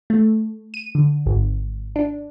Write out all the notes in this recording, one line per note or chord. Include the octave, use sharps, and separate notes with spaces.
A3
D#7
D3
G#1
D4